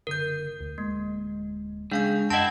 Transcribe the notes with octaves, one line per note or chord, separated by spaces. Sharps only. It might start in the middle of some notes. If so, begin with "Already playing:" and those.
F#1 D3 A#4 G6
D2
D1 G#3 A#3
C#3 G#3 D4 F5 G6
F#2 C4 E4 D#5 F#5 A5